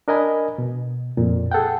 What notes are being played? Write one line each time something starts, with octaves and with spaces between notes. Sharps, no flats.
D4 A#4 D#5 G#5 B5
B2
F2 A#2
G#4 A4 F#5 G5